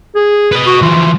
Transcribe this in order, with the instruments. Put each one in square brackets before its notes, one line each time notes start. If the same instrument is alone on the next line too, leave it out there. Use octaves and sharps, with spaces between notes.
[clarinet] G#4
[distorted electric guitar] B4 D#5
[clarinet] F#4
[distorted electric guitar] E3 F3 [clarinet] F4